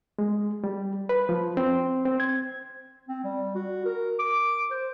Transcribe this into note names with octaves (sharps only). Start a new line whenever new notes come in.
G#3
G3
B4
F3
C4
C4
G#6
C4
G3
F#4
A#4
D6
C5